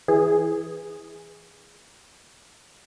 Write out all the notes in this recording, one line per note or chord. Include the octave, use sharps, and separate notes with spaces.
E3 G#4